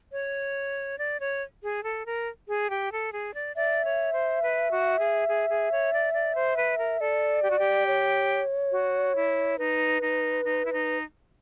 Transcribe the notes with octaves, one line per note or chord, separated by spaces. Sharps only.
C#5
D5
C#5
G#4
A4
A#4
G#4
G4
A4
G#4
D5
D5 E5
C#5
C5
B4
F#4
G#4
G#4
G#4
C#5
D5
D5
C5
B4
A#4
A4 D5
G4
F#4
G4
C#5
F#4
E4
D#4 B4
D#4
D#4
E4
D#4